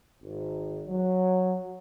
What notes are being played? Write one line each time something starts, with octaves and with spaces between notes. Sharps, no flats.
G#1
F#3